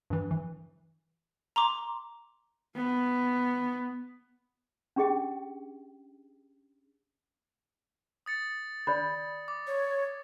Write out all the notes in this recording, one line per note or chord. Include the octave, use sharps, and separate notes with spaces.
G2 E3
E3
A#5 C6 D6
B3
C#4 D4 G4 G#4 D#5 G5
D#6 A6 C#7
D5 B5
D6
C#5